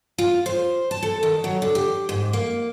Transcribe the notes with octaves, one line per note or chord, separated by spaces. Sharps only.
F4
C5
A5
A4
D#3
F#3
D3
G4
G#2
A#3